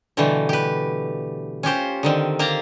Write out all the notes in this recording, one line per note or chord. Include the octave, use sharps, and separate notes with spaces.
B2 D3 E3 G3 A3
G4 B4
C#4 F4 G4 C5
D3 D#3 C4
A#3 G4 F5 A5 A#5